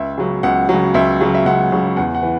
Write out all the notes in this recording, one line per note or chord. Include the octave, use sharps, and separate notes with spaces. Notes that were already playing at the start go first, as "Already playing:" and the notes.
Already playing: C#2 E5
C#3 F#3
C#2 F#5
C#3 F#3
C#2 E5
C#3 F#3
E5
C#2 F#5
C#3 F#3
E2 F#5
F#5
E3